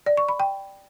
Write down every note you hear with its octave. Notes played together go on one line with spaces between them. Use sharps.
D5
C#6
B5
G5